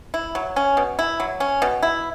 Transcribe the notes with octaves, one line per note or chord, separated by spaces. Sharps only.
E4
F#3
C#4
B2
E4
F#3
C#4
B2
E4